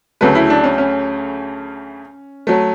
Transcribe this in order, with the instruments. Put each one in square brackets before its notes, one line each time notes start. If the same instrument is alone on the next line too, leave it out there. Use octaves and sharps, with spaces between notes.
[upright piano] D2 C#3 F#3 A3 B4
E4
D4
C#4
C#4
F#3 A3